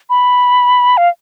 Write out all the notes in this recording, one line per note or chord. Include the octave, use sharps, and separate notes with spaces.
B5
F5